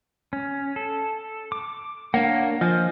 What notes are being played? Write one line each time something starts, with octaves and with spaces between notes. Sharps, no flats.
C#4
A4
D6
A#3 D4 C#5 F#5
F3 D#5 G#5 G6